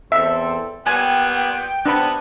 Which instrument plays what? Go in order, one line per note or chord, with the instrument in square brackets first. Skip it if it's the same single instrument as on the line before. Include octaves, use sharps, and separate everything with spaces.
[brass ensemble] E2 C4 A4 [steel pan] E5
[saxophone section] A#2 G3 B3 [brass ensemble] G5 [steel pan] G#5
[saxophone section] C3 B3 [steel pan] D4 B5